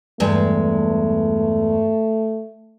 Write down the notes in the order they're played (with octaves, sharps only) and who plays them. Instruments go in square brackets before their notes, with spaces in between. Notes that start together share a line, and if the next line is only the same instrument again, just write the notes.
[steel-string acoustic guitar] E2 G2 G#3 [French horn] A3